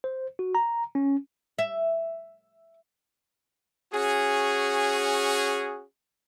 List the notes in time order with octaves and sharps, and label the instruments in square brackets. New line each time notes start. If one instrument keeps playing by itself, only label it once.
[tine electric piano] C5
F#4
A#5
C#4
[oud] E5
[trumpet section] C#4 F#4 G#4